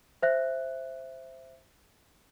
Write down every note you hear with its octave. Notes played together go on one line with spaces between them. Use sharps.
C5 E5 F#6